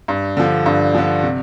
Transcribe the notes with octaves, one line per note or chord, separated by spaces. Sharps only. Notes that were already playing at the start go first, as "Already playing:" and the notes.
G2
D3 F3
G2
D3 F3
C3